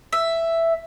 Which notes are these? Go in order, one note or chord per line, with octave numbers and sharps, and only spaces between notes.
E5